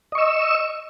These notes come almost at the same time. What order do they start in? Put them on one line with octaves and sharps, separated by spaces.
D#5 C#6 E6